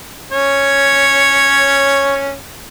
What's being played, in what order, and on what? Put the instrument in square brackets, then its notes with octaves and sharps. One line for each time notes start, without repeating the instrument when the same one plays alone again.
[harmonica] C#4 C#5